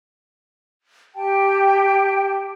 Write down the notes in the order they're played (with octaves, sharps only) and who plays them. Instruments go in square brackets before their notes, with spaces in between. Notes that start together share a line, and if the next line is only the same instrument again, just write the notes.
[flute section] G4 G5 A5